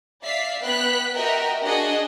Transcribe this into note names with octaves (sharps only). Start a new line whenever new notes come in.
D5 E5 F5 B6 C7
B3 G5 F#6 B6
F#4 G4 A#4 D#5 E5 G5
D4 F#4 G#4 D#5